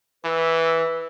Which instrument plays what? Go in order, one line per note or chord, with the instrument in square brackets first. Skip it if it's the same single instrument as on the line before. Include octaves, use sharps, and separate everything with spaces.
[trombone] E3 [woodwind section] B4 E6